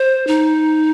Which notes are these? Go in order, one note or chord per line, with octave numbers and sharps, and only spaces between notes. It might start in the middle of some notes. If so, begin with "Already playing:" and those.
Already playing: C5
D#4